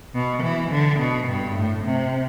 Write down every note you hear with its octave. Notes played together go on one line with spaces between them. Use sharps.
B2
E3
D3
B2
G2
A2
C3